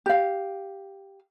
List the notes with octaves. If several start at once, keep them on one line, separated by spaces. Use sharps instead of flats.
G4 F5